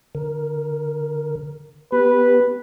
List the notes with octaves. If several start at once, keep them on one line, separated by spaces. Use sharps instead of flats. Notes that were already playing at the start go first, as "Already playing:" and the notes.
D3 A#4
B3 G4 B4